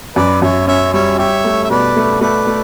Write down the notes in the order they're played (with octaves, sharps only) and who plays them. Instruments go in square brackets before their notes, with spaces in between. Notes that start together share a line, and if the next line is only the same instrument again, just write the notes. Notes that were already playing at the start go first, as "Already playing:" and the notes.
[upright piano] F#2 [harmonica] B4 D5
[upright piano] F#2 [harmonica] C#5 E5
[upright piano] C#4 [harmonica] C#5 E5
[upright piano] G3 [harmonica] C#5 E5
[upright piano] G4 [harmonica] C#5 E5
[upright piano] A3
[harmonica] E5
[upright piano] B2 [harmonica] B4 D5
[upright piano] A3
[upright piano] A3 [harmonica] B4 D5
[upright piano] A3